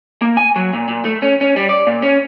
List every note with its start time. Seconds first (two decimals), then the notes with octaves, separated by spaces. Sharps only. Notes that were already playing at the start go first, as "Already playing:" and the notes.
0.22 A#3
0.37 G#5
0.56 F#3
0.73 A#2
0.88 A#2
1.05 A3
1.22 C#4
1.41 C#4
1.56 G3
1.69 D5
1.87 A#2
2.02 C#4